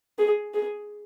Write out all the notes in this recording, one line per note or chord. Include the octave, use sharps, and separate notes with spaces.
G#4
G#4